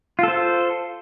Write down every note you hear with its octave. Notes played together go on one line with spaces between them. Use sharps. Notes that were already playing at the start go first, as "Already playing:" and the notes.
F4 A4 C5